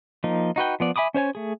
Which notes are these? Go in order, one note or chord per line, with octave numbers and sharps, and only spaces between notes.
F3 A#3 D#4
D#4 F#4 B4 G5
F3 B3 D5
E5 G#5 B5 D6 D#6
C#4 C5 C#5 G#5
A3 G#4